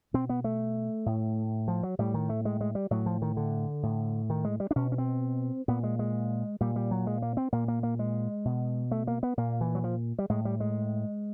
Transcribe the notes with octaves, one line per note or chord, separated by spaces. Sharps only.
B2 C4
B3
A3
A2
F3
F#3
A2 G3
D#3
A3
G#3
G#3
G3
A2 F#3
F3
D#3
D3
A2
D#3
G#3
G3
D4
B2 C#4
C#4
C4
A#2 B3
G#3
G#3
A#2 G3
G3
F#3
G#3
A#3
C4
A#2 A#3
A#3
A#3
G#3
B2
A3
A#3
B3
A#2 A#3
E3
F#3
F3
G3
A2 G#3
G3
G#3